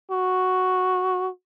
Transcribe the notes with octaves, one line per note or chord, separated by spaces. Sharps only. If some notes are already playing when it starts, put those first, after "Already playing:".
F#4